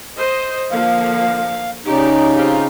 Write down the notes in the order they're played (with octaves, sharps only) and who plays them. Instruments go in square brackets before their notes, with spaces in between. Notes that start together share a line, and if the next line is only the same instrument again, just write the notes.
[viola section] C5 D#5
[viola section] D3 F3 A#3 [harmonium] F5
[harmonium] C#3 D#4 [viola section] G4 D5
[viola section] C4 F4 G4